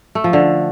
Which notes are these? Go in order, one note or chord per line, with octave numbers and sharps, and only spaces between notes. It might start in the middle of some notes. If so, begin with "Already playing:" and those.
A3
F3
D3